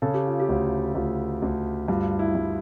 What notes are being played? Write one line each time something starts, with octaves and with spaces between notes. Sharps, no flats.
C#3 A4
G4
F4
G4
D2
D2 F4
D2
G2 F4
E4
G2